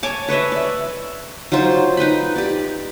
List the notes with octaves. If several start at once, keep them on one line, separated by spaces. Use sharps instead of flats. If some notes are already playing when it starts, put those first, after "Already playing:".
C#5 G#5 A5 D6
B4 C#5 D#5 E5
D5 E5
F#3 D#4 F4 C5
D#4 B4 G5 B5
G4 D5